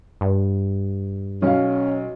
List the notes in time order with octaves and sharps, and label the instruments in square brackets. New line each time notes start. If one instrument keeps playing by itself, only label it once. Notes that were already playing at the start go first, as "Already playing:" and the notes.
[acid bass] G2
[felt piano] B1 F5 [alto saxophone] C#4